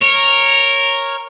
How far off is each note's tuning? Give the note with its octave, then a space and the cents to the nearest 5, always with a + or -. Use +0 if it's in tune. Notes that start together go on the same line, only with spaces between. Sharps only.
A#4 -5 C#5 -10